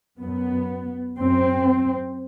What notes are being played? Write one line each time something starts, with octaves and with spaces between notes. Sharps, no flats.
F#2 B3
F#2 C4